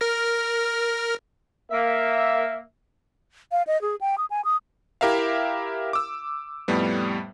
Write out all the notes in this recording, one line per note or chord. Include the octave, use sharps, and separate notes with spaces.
A#4 F6 A#6
A#3 E5
F5
D#5
G#4
G5
D#6
G#5
D#6
E4 G4 A#4 E5 F5
D6 E6
F2 A2 G3 B3